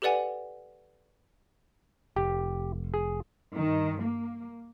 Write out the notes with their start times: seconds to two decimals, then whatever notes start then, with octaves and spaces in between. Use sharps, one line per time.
0.02 G4 A4 B4 D5 F#5 G#5
2.16 F1 G4
2.94 G#4
3.55 G2 D#3
4.01 A#3